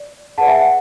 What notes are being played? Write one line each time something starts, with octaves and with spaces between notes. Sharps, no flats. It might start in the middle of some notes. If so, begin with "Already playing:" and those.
Already playing: D5
G#4 B4 D5 F#5 A5
E5 G#5
F#5